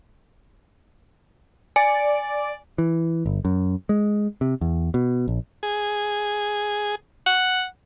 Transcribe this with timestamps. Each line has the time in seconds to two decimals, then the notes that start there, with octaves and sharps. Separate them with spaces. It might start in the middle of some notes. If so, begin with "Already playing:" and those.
1.76 D5 G#5
2.78 E3
3.26 G1
3.45 F#2
3.89 G#3
4.41 C3
4.61 E2
4.94 B2
5.28 A#1
5.63 G#4
7.26 F#5